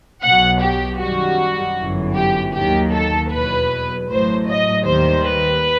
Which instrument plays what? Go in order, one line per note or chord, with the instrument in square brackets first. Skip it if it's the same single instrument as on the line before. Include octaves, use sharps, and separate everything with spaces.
[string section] B1 B2 F#3 F#5
G4
F#2 D#3 G3 F#4
G1 F#2 E3
G4
D#2 D#3 F#3 G4
A4
E2 B2 F#3 B4
A1 A2 F#3 C5
D#5
D#2 D#3 G3 C5
B4